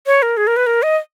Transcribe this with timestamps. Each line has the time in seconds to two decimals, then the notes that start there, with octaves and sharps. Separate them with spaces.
0.06 C#5
0.22 A#4
0.37 G#4
0.47 A#4
0.57 B4
0.67 A#4
0.83 D#5